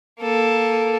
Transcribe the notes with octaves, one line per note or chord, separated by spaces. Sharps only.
A#3 A4